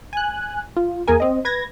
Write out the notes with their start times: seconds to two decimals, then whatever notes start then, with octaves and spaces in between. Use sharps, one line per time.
0.13 G#5 F#6
0.77 F4
1.08 E2 A#3 G#4 A#4 G#5
1.20 C4 D#5
1.45 B4 G#6 A#6